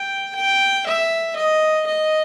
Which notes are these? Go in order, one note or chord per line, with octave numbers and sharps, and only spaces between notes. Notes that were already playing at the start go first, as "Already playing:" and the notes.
Already playing: G5
G5
E5
D#5
D#5